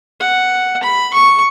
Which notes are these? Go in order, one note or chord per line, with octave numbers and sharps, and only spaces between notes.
F#5
B5
C#6